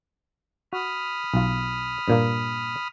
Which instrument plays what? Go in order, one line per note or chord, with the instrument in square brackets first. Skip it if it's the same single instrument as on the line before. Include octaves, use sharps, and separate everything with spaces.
[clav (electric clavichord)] F#4 [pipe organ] B5 D#6 F6
[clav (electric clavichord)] B1 F4
G2 A#2 A#3